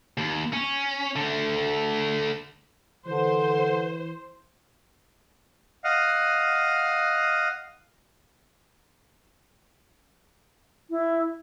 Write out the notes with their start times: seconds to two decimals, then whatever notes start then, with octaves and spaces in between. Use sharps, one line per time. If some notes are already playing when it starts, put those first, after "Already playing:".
0.18 D#2
0.53 C#4
1.16 D3 A3
3.07 D3 E3 C5
5.84 D#5 F5 F#5
10.90 E4